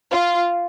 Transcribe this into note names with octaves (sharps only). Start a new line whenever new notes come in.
F4